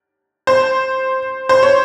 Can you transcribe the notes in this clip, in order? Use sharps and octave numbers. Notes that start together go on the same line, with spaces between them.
C5
C5
C#5